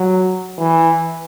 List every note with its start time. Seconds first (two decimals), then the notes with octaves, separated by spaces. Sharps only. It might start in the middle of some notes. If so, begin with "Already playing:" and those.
Already playing: F#3
0.58 E3